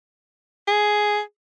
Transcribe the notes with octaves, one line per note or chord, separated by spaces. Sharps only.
G#4